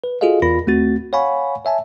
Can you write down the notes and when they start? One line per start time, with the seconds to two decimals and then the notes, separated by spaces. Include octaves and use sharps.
0.04 B4
0.21 F4 F#4 G#4 A4 D#5 F5
0.42 E2 F4 A#4 B5 A#6
0.67 D#2 A3 C4 F#4 A6
1.13 C#5 F5 F#5 G#5 B5 C#6
1.65 C#5 E5 G#5 A5